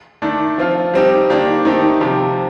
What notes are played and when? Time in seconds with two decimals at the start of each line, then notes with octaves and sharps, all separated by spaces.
0.22 D#3 A3 D4
0.58 F3 C4 F4
0.94 G3 C4 D#4 G4
1.30 D#3 A#3 D4 G4
1.65 D#3 A3 C4 D#4 G4
2.01 C3 F3 C4 G4